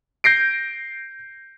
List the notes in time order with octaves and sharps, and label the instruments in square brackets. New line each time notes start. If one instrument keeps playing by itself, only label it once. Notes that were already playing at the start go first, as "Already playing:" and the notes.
[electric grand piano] G6 A#6 C7 D7